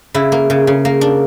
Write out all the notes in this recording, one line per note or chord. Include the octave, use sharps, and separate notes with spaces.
C#3 E4
A#3
C#3
C#3
A#3
D4